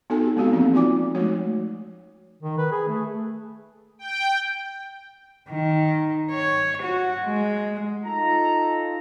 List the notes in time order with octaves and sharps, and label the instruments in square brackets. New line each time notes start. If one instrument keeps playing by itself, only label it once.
[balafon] B3 D#4 F#4 A4 G#5
G4
G#3 B3 C4 F#4 G4 F5
E3 F3 A#3 C4 C#4 F#4
D#4 F4 F#4 D5 G#5 D6
F3 G#3 A3 D#4 F#4 C#5
[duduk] D#3
B4
G#4
A3
[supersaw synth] G5
[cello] D#3
C#5
F#4
G#3
[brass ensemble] D#4 F4 A4 [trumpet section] A#5